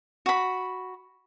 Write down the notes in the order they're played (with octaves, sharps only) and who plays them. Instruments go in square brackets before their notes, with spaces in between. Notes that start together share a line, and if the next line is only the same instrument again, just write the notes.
[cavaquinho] F#4 B5